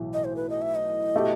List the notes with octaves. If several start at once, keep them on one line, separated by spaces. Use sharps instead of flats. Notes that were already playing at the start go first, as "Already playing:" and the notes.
Already playing: B1 A2 E3 A3
D#5
C5
B4
D#5
E5
D#5
B2 A3 E4 G4